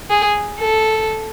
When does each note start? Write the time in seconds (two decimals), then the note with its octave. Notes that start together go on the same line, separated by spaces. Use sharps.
0.10 G#4
0.60 A4